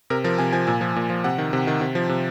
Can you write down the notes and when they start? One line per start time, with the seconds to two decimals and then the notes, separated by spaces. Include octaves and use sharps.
0.10 C3 A#4
0.24 F3 A#4
0.38 C3 G#5
0.52 F3 G#5
0.67 A#2 G#5
0.81 F3
0.96 A#2
1.10 F3
1.24 C3 F#5
1.38 D#3
1.53 C3
1.67 D#3
1.81 C3
1.95 F3
2.09 C3